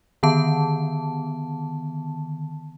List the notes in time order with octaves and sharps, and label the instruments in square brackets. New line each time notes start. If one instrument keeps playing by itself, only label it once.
[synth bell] D3 D#3 B3 A5